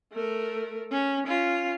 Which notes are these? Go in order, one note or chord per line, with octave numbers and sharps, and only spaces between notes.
A3 A#4
C#4
C#4 F4